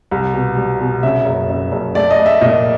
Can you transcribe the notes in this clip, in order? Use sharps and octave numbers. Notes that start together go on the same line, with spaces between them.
C2
B2
G3
B2
C#3 E5
F#1
F#1
F#1
A3 D5
D#5
A3
E5
A#2 D#5